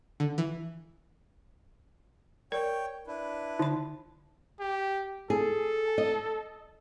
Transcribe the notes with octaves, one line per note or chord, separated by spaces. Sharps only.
D3
E3
A#4 C#5 D5 G5
D4 E4 B4
D3 D#4 B5
G4
G#4 A4
D#5